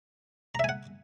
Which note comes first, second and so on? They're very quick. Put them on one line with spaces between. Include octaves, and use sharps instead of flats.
A#5 E5 G#5 F#5